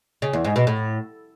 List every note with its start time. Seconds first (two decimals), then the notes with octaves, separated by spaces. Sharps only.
0.22 C#3
0.33 E2
0.45 G#2
0.56 B2
0.67 A2